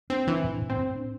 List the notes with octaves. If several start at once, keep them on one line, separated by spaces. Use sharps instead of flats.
C4 D4
E3 D4
A2
A2
C4
A2
D4